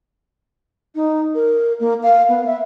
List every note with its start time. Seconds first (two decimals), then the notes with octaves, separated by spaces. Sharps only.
0.95 D#4
1.35 A#4
1.80 A#3
2.03 F5
2.29 B3
2.46 E5